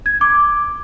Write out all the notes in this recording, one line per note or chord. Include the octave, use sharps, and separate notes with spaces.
G#6
D6